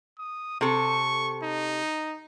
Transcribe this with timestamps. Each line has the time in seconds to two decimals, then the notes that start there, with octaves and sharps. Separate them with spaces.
0.18 D#6
0.61 C3 A4 C#6
1.42 D#4